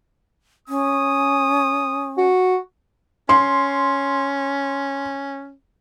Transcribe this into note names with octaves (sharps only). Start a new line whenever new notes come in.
C#4 D#6
F#4
C#4 C6